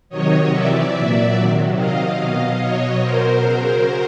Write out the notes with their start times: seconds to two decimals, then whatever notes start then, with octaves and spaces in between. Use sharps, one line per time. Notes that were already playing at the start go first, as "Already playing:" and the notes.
0.09 C3 D#3 F#3 C#5 D#5
0.50 C3 E3 D5 E5
0.92 A#2 F#3
1.34 C3 D#3 F#3
1.75 C3 D#3 F#3 D#5 F5
2.17 B2 F#3
2.58 B2 F#3 C#5 D#5
3.00 B2 F#3 A#4 C5
3.41 C#3 F#3